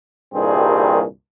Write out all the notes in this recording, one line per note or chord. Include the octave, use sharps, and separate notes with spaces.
C2 G2 A#2 D#3 C4 G#4